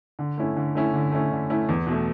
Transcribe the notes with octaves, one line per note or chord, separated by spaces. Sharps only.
D3
A3 C#4 E4
D3
A3 C#4 E4
D3
A3 C#4 E4
D3
A3 C#4 E4
E2
B2 A3